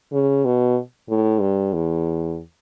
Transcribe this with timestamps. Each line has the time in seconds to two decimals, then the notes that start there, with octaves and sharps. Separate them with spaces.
0.12 C#3
0.45 B2
1.10 A2
1.40 G2
1.73 E2